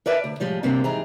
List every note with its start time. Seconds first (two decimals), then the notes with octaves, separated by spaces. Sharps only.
0.06 A#4 B4 D5 E5 A5
0.24 D2
0.40 A2 F3 G3 G#3
0.63 D2 C3 G3 A#3 C4 D4
0.84 G#2 D#3 E3 G3 G#4 A#5